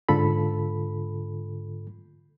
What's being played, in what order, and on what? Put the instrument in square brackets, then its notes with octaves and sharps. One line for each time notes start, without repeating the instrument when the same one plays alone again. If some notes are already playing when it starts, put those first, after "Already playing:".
[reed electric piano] G#2 D3 F4 A4 B5